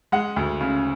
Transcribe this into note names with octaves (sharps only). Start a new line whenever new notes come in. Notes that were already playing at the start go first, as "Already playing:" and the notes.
G#3 F#5
D2
C#3